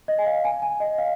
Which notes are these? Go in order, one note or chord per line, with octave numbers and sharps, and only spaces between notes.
D#5
G#5
F5
G#5
G#5
D#5
F5